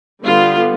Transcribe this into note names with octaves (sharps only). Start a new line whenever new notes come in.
D3 G3 B3 F4